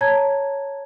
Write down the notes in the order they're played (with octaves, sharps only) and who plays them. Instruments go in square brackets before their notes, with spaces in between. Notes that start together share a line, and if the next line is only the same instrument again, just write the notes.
[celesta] C#5 A5 A#5 G#6